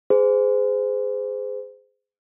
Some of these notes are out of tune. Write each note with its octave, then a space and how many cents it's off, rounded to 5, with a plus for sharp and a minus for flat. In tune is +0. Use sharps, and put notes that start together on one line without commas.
G#4 +0 C5 -35